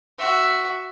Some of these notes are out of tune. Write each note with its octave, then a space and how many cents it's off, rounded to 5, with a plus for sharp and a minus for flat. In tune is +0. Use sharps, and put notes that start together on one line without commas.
F#4 +0 E5 +0